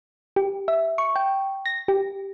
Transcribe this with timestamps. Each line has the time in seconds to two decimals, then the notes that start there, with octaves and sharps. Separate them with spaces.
0.36 G4
0.68 E5
0.98 C#6
1.16 G5
1.66 A#6
1.88 G4